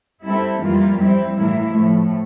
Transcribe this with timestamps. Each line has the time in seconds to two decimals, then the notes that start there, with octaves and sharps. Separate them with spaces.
0.22 G3 C4 E4 A4
0.60 F2 E3 G3 A#3 F4
0.96 G3 C4 E4
1.34 A2 E3 A#3 E4
1.71 A2 F3 A3